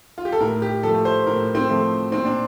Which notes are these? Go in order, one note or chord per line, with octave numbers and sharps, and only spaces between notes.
F4
G4
A4
A2 A#4
G4
F3 A3 A4
C5
A2 A#4
C4
F3 A3
A#2 C4
D4